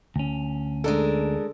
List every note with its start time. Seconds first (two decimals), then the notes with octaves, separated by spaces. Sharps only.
0.16 D2 C#4
0.84 G#3 D4 A4 A#4